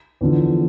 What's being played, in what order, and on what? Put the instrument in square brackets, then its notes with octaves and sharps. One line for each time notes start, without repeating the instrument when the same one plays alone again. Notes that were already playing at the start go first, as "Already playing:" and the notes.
[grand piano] E2 D3 F3